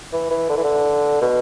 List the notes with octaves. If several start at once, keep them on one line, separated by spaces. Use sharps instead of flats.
E3
E3
D3
E3
D3
B2